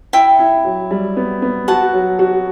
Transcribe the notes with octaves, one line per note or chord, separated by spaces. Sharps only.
E4 E5 G5
E4
F#3
G3
B3
B3
F#4 F#5 A5
F#3
F#4